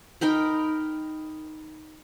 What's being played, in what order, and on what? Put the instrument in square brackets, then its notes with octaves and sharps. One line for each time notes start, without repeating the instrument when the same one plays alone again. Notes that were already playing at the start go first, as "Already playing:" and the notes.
[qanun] D#4 A#4 G5 B5